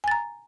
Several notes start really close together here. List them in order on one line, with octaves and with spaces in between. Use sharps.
G#5 A6 A#5